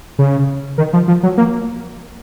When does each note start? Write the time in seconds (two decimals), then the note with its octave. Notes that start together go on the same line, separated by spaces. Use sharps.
0.18 C#3
0.78 D#3
0.93 F3
1.08 F3
1.23 F#3
1.37 A#3